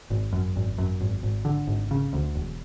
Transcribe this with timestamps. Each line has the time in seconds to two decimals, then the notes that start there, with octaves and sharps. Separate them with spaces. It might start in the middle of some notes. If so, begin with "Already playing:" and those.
0.10 G#1
0.33 F#2
0.56 G#1
0.78 F#2
1.00 G#1
1.23 G#1
1.45 D3
1.67 G#1
1.91 C#3
2.13 D2
2.35 E1